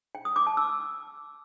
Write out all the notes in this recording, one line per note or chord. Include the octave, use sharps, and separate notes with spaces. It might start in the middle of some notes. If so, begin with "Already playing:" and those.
G5
D#6
D6
A5
E6